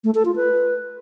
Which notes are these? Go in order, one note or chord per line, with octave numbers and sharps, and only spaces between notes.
A3
A4
F4
B4